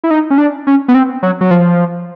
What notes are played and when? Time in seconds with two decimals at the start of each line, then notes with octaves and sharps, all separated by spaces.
0.04 E4
0.11 D#4
0.30 C#4
0.38 D4
0.67 C#4
0.88 B3
0.94 C4
1.23 F#3
1.41 F#3
1.51 F3